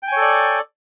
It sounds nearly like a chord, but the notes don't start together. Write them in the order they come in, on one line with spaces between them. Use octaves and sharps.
G5 G#5 C#5 A4 D5